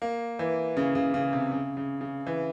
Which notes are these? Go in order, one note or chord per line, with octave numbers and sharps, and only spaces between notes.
A#3
E3
C#3
C#3
C#3
C3
C#3
C#3
C#3
E3